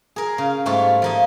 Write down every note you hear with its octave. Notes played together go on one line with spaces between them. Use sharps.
G#4 A#4
C#3
G#2 G3 A3 F4 C#5
F3 A#3 D#5